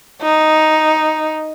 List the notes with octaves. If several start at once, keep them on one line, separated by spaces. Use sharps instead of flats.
D#4